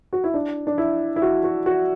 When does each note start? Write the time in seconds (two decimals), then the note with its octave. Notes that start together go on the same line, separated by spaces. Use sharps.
0.13 F#4
0.24 E4
0.34 D4
0.67 D4
0.78 E4
1.16 E4
1.22 F#4
1.44 F#4
1.66 F#4